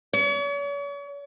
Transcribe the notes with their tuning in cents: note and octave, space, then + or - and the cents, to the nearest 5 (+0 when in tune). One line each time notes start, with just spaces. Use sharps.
C#5 +40